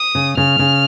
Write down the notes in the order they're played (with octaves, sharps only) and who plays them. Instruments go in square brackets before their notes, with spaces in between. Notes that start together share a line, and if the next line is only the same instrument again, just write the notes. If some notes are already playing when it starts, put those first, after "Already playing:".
Already playing: [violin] D#6
[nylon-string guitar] C#3
[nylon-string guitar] C#3 [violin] F6
[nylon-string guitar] C#3